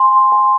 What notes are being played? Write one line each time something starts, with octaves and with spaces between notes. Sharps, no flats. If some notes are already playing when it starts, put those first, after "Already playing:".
Already playing: G#5 C6
G#5